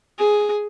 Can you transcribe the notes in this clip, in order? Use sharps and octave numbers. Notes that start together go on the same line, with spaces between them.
G#4